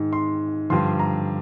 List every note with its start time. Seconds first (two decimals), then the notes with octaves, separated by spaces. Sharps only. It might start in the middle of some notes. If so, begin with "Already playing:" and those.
Already playing: G#2 D#3
0.13 C6
0.70 G2 D3 F3 C6
0.99 A#5